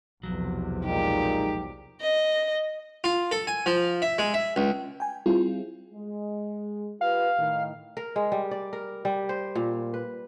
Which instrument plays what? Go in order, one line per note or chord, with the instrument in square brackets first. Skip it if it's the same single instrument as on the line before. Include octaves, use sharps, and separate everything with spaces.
[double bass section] B1 E2 C3 [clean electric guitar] F3 F#3
[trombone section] A#2 G#3 D#4 [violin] G4
[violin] D#5
[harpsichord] F4
A4
G#5
F3
E5
G#3
E5
C#2
[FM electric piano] G5 G#5
G3 C4 E4 F4 G#4
[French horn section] G#3
[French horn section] F4 G4 B4 [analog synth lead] F5
[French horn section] A2 D#3
[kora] A#4
G#3
G3
D5
A#4
G3
C5
A#2
B4